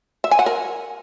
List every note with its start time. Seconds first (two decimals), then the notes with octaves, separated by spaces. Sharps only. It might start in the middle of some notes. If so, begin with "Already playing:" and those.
0.24 E5
0.31 G#5
0.39 F#5
0.46 A#4